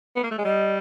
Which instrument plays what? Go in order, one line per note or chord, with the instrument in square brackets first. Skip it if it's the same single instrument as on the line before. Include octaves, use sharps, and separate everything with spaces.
[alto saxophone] B3
A#3
A3
G#3
[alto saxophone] G3 [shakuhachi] D#5